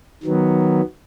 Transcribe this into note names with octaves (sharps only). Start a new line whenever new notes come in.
D#3 F#3 B3